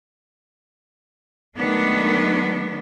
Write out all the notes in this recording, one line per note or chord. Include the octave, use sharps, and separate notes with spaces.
D#3 F#3 G#3 A3 B3 D4